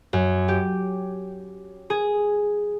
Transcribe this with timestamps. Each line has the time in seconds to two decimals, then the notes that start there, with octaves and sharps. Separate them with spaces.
0.13 F#2
0.48 G4
1.90 G#4